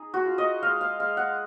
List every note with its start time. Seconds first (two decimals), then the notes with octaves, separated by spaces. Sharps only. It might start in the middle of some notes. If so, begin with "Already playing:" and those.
Already playing: D#4 G#4
0.14 F#4
0.25 F4
0.38 D#5
0.62 G#3 F5
0.81 F5
0.99 G#3 F5
1.17 F#5